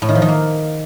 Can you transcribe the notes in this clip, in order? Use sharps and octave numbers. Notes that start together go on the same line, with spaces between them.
A2
D#3
F3
D#3
A#3